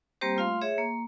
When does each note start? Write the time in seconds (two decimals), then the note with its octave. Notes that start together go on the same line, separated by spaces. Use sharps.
0.21 G3 A#3 C4 G4 C5
0.37 A3 F4 F5 C6
0.61 G#4 C#5 E5
0.78 A#3